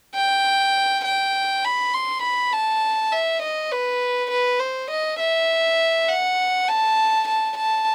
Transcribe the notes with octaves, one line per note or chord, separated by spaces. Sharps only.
G5
G5
B5
C6
B5
A5
E5
D#5
B4
B4
C5
D#5
E5
F#5
A5
A5
A5